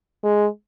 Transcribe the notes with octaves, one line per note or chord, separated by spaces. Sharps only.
G#3